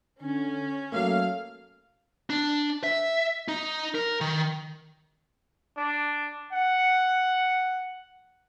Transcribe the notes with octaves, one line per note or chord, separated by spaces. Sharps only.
D3 C#4
F#3 A3 A#3 A4 F5
D4
E5
D#4
A#4
D#3
D4
F#5